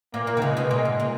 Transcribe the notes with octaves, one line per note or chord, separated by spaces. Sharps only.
A#2 A#3
A#2
D#3
C#3 G#3
B2
A#2 G#3
G#2
A#2